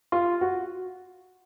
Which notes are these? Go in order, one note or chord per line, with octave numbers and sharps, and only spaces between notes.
F4
F#4